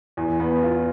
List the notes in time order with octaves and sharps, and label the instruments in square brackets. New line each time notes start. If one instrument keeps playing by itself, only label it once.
[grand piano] E2
B3
F4